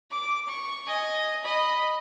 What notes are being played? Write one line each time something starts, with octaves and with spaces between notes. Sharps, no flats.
D6
C#6
D#5 G#5
D#5 B5